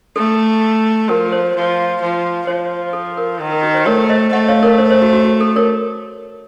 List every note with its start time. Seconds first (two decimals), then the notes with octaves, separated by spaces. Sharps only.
0.16 A3 A4
1.09 F3 A#4
1.32 C5
1.55 F3
2.01 F3
2.47 F3 C5
2.93 A4
3.17 A#4
3.40 D#3
3.52 A#4
3.63 F#4
3.74 C5
3.86 A3 A#4 C#5
4.09 C5 D#5
4.33 A3 D#5 F#5
4.48 C#5 F5
4.63 A#4 C#5
4.78 C5
4.90 C5
5.02 F#4
5.13 F#4
5.24 F#4
5.41 A4
5.56 A#4 C#5